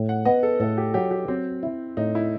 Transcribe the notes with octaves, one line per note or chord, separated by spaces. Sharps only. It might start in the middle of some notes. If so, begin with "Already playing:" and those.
Already playing: A2
F#5
B3 D#5
A4
A2 A4
G4
F#3 G4
G4
F#3 C4
E4
A2 D#4
E4